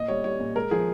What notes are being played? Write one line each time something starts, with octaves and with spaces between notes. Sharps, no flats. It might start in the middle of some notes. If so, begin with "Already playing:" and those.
Already playing: A#2 D#5
G3 C#5
G3 C#5
A#2
G#3 A#4
F3 G#4